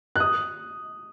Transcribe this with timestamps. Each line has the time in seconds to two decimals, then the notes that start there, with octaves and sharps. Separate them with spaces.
0.16 F#6
0.20 D#6